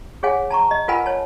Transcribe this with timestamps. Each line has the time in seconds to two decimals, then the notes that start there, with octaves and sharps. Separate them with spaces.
0.23 G#4 C#5 F#5 G#5
0.50 A5 A#5 C#6
0.71 D#5
0.88 F4 A#4 B4 F#5 G#5 B5
1.06 C#5 A5